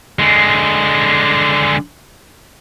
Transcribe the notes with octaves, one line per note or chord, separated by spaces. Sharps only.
D3 G#3